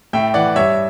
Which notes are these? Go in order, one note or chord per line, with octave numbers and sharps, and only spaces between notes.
A2 E5 G5
E3 D5 F#5
G2 C#5 E5